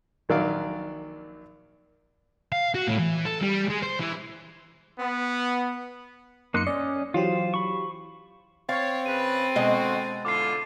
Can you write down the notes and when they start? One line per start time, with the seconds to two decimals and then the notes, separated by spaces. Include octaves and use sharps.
0.29 A#1 D#3 F#3 D5 F5
2.52 F5
2.75 F#4
2.87 A2
2.99 E3
3.26 A4
3.43 G3
3.70 G#3
3.83 C5
4.00 E3
4.98 B3
6.54 F#2 A#3 D#4 C6 F#6 C#7
6.67 C#4 D5 D#5
7.14 E3 F#3 F4 G4 C5
7.54 B5 C#6
8.69 C4 C#5 F5 A6
9.06 C#3 B4 D#7
9.56 B2 D3 G#3 F#4 D#5
10.25 D3 E4 F4 D6 C7